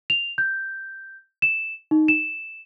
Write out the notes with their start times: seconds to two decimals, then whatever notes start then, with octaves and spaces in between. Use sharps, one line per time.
0.10 F7
0.38 G6
1.42 E7
1.91 D#4
2.08 E7